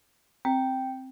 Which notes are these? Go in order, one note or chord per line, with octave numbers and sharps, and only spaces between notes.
C4 G5